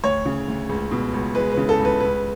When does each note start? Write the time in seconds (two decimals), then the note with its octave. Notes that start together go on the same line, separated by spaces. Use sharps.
0.04 D2 C#5
0.25 C#3
0.48 D2
0.69 C#2
0.91 B2
1.13 C#2
1.35 G#3 B4
1.52 B4
1.57 C#3
1.69 A4
1.79 C#2
1.85 B4
2.00 C#2 B4